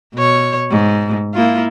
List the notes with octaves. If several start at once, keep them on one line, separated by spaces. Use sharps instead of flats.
B2 C#5
G#2
A#3 E4 F4